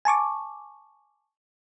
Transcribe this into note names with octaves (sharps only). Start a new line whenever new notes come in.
G#5 A5 C#6 D6